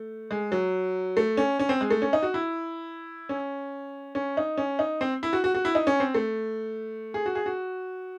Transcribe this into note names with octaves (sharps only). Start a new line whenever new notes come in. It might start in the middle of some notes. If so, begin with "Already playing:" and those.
Already playing: A3
G#3
F#3
A3
C#4
C#4
C4
G#3
A3
C#4
D#4
F#4
E4
C#4
C#4
D#4
C#4
D#4
C4
E4
F#4
F#4
F#4
E4
D#4
C#4
C4
A3
G#4
F#4
G#4
F#4